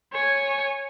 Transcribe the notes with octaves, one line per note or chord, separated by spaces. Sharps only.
C#5 G#5